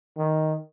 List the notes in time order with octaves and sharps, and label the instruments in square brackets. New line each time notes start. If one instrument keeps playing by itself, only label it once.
[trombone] D#3